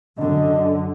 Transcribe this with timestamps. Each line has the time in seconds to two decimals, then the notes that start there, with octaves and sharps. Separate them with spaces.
0.18 F#2 D3 D#5